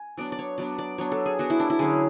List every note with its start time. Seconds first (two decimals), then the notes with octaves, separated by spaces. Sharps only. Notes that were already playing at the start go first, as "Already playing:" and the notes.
Already playing: G#5
0.17 F#3 B3 D4 D5
0.32 D5
0.39 C#5
0.58 F#3 B3 D4 D5
0.79 D5
0.98 F#3 B3 D4 C#5
1.12 A4
1.26 G#4
1.39 F#3 B3 D4 F#4
1.50 E4
1.60 D4
1.70 E4
1.79 D3 F#3 C#4 G#4